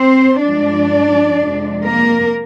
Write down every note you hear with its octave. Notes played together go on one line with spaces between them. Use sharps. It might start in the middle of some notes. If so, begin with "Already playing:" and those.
Already playing: C4 C5
G2 F3 G#3 D4 D5
F2 C3 F3 G#3
A#3 A#4